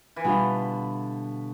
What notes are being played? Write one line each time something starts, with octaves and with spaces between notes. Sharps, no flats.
E3
B2 D3 G3 D4 F4